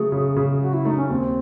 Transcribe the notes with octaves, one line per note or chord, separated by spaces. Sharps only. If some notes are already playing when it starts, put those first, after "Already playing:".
Already playing: C#3 F#3 A3 G#4
C#3
C#3
F#3 F#4
E4
A3 D#4
C#4
D#2 C4